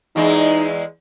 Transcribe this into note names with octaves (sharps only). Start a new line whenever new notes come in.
E2 G#3 D#4 E4